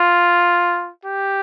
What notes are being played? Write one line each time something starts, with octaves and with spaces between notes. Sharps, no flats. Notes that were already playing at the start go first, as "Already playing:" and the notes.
Already playing: F4
G4